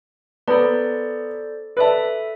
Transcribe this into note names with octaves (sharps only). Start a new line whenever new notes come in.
B3 A4 C5 D5 A#5
A4 B4 D5 E5 A5